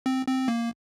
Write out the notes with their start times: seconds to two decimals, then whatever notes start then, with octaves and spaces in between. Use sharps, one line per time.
0.06 C4
0.27 C4
0.48 A#3